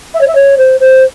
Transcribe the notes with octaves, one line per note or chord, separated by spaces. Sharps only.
E5
C#5
E5
C#5
C5
C5